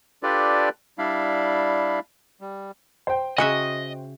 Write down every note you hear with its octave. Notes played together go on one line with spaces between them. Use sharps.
D4 F4 G4 A4 B4 D5
G3 D4 E4 F5 B5
G3
C5 G5
C#3 F#4 G#4 D#5 E5